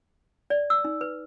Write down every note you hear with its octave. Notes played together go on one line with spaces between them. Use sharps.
D5
E6
D#4
B4